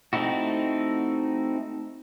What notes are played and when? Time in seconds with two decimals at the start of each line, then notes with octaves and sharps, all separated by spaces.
0.13 A3 C4 D#4 E4 F#4